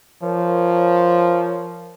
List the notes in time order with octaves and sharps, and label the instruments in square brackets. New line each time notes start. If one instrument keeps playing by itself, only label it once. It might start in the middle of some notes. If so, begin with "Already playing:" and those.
[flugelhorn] F3 [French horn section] A#4 C#5